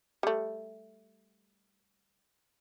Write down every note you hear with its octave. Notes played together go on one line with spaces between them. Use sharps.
G3 A3